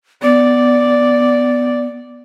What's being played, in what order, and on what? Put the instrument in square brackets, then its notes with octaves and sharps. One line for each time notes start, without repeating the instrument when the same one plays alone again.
[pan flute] B3 [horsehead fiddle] D5